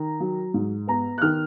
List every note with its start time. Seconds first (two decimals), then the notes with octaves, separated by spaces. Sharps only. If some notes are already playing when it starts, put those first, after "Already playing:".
Already playing: D#3 A#5
0.20 F#3
0.54 G#2
0.87 B3 A#5
1.18 F#6
1.21 D#3 F6